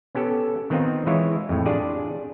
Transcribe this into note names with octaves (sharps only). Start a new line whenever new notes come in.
B3 C#4 G4 A4
D#3 B3 C4 D#4 F4
E3 G#3 E4 F4 C#5
F2 A2
D4 F4 G4 G#4 D5